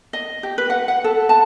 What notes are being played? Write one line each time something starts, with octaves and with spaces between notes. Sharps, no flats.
D#5
G4
B4
F#5
F#5
A4
A5